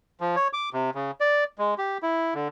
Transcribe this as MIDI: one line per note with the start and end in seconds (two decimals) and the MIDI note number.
0.21 0.36 53
0.36 0.48 73
0.53 0.69 86
0.73 0.90 48
0.95 1.11 49
1.20 1.44 74
1.58 1.74 56
1.78 1.98 67
2.03 2.34 64
2.34 2.48 50